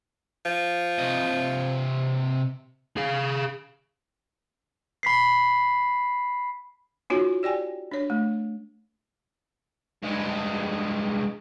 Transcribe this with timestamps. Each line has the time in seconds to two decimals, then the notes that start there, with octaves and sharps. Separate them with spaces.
0.46 F3
0.99 C3 D#5
2.97 G#4 F5
5.03 B5 B6 C7
7.10 B3 D#4 F4 F#4 C#5
7.43 G4 D5 G5 G#5
7.92 D4 C#5
8.10 A3
10.03 G2 G#3